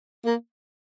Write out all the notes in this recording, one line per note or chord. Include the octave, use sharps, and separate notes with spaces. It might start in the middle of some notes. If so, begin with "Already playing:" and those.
A#3